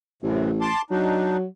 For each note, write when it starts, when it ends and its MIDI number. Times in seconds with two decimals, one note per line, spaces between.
0.22 0.69 33
0.22 0.51 42
0.22 0.51 45
0.22 0.51 48
0.61 0.82 81
0.61 0.82 84
0.61 0.82 86
0.90 1.45 54
0.90 1.37 62
0.90 1.37 63